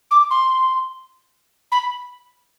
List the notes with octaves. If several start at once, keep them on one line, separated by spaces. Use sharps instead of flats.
D6
C6
B5